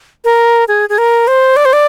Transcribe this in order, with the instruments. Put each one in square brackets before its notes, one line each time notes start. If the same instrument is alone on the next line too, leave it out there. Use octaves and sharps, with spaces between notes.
[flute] A#4
G#4
G#4
A#4
C5
D5
C5
D5